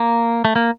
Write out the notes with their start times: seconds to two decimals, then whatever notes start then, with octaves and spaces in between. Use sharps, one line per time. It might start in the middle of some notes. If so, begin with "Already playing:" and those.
Already playing: A#3
0.45 A3
0.56 A#3